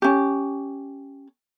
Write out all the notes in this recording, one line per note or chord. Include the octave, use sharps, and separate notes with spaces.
C#4 G4